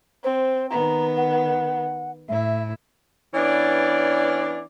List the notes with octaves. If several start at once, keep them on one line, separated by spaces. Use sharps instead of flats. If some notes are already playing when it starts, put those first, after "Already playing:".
C4 C5
D#3 B3 A#5
F#5
A2 E4 E5
E3 B3 C#4 D4 D5